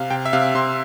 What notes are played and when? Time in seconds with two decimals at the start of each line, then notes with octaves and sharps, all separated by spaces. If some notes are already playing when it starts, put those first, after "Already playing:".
Already playing: C3 F5
0.10 C3 G5
0.25 E5
0.33 C3 F5
0.55 C3 C6